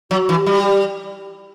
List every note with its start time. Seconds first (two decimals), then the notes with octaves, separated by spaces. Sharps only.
0.11 F#3 F#4
0.29 E3
0.37 G4
0.46 G3
0.64 G4